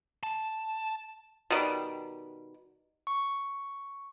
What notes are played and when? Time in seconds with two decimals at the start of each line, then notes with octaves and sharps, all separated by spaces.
0.23 A5
1.50 B2 D#3 G3
3.07 C#6